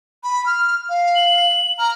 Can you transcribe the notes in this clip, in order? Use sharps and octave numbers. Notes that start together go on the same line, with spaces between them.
B5
F6
F5
F#7
A#5 F6